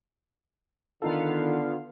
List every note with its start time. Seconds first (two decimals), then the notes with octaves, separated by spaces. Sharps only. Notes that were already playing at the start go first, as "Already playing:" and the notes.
1.02 D3 D#3 B3 D#4 F4 A4 F5